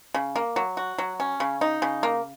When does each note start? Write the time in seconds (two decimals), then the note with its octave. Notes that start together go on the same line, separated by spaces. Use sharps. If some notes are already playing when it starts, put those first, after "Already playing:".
0.14 C#3
0.36 A#3
0.56 F#3
0.77 F#4
0.98 F#3
1.20 C#4
1.40 C#3
1.61 D#4
1.82 C#3
2.03 A#3